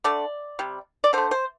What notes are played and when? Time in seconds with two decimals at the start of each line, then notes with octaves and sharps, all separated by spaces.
0.04 D3 A3 D5
0.59 C3 G3
1.04 D5
1.13 D3 A3 C5
1.31 C5